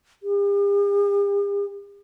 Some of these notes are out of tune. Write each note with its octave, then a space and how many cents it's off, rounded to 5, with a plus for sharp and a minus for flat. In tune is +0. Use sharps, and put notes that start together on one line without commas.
G4 +45